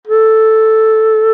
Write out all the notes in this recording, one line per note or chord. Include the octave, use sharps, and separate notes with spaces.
A4